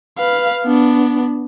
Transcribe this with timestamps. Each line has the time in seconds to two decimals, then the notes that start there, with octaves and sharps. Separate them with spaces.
0.18 B4 F5
0.65 B3 D4